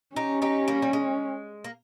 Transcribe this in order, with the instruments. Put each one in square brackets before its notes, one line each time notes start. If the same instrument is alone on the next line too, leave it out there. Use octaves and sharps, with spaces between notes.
[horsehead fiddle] C#4 [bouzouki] D#4 G4
[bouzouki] D#4 G4
G3 A#3
G3
G#3
A#3